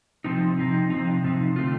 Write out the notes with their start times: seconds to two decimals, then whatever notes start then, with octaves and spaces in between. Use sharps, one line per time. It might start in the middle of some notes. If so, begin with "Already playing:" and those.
0.24 C3 F3 C4 D#4
0.57 C3 F3 C4 D#4
0.90 C3 F3 C4 D#4
1.24 C3 F3 C4 D#4
1.56 D3 A3 C4 F4